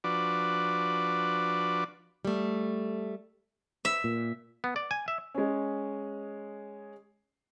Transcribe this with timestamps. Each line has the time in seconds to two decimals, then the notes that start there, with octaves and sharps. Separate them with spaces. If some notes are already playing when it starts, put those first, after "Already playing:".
0.04 F3 D4 F#4 B4 D5
2.25 G3 A3
3.85 E5
4.04 A#2
4.64 B3
4.76 D5
4.91 G#5
5.08 E5
5.35 G#3 C#4